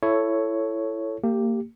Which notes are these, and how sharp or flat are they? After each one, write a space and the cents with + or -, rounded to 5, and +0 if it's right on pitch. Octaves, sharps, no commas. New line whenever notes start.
E4 +15 A4 +0 C#5 +0
A#3 -30 G4 +0